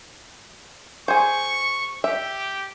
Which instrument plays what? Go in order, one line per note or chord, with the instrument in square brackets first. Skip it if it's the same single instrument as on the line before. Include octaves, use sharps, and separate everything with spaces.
[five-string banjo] G#4 C5 [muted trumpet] C#6
[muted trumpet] G4 [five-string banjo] E5